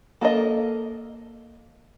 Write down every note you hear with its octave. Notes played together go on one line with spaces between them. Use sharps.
A#3 A4 A#4 D#5